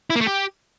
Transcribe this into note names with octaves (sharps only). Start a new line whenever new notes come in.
E4
A#3
A3
G4